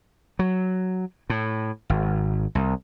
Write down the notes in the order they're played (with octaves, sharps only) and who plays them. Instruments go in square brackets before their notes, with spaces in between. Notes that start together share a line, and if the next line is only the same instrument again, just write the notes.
[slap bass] F#3
A2
G#1
C2